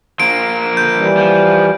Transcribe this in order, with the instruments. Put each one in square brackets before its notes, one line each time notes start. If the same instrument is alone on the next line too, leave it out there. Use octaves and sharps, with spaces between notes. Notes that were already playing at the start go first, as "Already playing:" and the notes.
[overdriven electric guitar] F3 A#3 [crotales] D7
[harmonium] D3 [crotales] G6
[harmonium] E3 G3
[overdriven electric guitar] F3